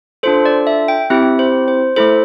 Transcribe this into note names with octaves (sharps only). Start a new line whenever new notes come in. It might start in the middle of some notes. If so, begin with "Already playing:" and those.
D4 F4 A4 C5
D5
E5
G5
C4 E4 G4 E5
C5
C5
A3 E4 A4 C5